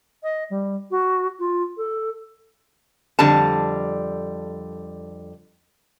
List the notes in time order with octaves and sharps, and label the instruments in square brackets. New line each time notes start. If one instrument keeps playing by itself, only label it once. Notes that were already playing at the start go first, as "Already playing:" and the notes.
[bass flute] D#5
G3
F#4
F4
A4
[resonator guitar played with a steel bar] F2 D3 G3 A5